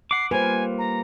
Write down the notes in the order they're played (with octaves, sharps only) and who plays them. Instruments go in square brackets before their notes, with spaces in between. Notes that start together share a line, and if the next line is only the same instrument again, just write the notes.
[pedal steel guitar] F#5 D6 [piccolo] C7
[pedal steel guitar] G3 A#3 F4 [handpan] B4 C5 [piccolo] G#5
[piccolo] A#5